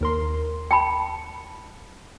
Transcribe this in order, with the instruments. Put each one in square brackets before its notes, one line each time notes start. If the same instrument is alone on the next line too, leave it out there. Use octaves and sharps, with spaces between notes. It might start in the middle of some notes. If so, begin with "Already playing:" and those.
[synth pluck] D#2 A#4 C6
[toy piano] G5 A5 B5